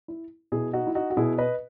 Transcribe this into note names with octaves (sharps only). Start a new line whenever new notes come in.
E4
B2 E4 G#4
D#4 F#4
E4
D#4 F#4
F#4
B2 E4 G#4
B4 D#5